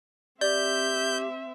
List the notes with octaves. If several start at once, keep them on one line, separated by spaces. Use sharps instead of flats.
C4 G4 D5 E5 G6